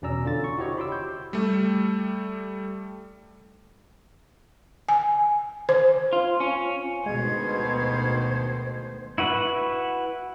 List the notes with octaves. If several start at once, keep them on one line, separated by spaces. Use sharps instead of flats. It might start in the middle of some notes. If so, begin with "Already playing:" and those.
E2 B2 C#4 D5 A#5 E6
D3 F4 A6
C#6
E4 F#4 G4 C5 C#5 D#5
B5 C6 D6 E6
G6
G3 A3
G#5
C5
F4
C#4
D2 B2 D#3 G#3 C5 G#6
E4 F#4 B4 F#5